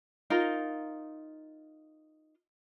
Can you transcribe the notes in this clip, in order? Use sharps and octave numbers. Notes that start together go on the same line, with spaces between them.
D#4 F4 A#4